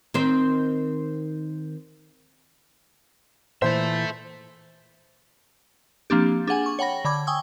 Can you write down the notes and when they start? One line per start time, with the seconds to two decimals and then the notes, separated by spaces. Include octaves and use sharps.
0.14 D#3 C4 C5
3.62 A#2 E3 A4 C5 E5
6.10 F3 A#3 C4 D4 G4
6.47 D4 G#4 F#5 G#5
6.66 C#6
6.79 C#5 F#5 G5 B5 A#6
7.05 D3 B5 D6 G#6
7.27 G5 G#5 C#6 D#6 E6